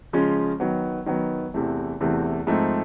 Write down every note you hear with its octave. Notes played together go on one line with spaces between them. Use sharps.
C#3 F3 G#3 C#4 F4
D#3 F#3 B3
D#3 F#3 B3
E2 C3 E3 A3
E2 C3 E3 A3
G#2 F3 A3 C4 D#4